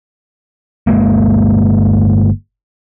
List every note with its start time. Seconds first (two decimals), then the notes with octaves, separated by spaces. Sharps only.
0.87 G1 G2 G#3 A#3